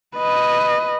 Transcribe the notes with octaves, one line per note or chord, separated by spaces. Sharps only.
B4 D#5